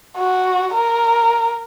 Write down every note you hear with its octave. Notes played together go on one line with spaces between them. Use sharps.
F#4
A#4